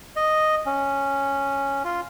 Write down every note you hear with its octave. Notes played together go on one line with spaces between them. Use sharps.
D#5
C#4
F4